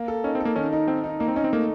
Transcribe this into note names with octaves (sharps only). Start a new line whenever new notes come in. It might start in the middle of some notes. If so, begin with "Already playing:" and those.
Already playing: A#3
A4
C#4 D#4
C4
A4
A#3
D#3 C#4
D#4
D#3 C4
D#4
A#3 D#4
C4
C#4 D#4
C4
A3 A#3